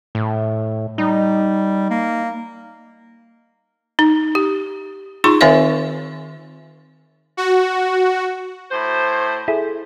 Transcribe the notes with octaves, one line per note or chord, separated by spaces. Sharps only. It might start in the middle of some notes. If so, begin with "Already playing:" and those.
A2
G3 D#4
A#3
D#4
G4
D#4 F4 G#4 C6 C#6
D#3 C4 A#4 C#5 E5 F5
F#4
A2 C5
E4 G#4 A4